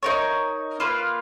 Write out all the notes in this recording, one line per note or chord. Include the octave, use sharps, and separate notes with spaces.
D#4 A#4 C#5
A#3 F4 B4 F5